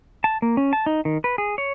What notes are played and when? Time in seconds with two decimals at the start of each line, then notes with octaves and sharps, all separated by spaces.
0.24 A5
0.42 A#3
0.57 C#4
0.73 A5
0.86 D#4
1.05 D#3
1.24 B4
1.38 G#4
1.58 C#5